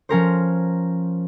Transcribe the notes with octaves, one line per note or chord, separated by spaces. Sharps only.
F3 C#4 A#4 C5